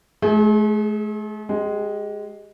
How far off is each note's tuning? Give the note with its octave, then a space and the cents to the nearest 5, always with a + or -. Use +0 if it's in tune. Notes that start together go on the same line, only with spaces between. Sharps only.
A3 -45 G#4 +0
G#3 +0 G4 -30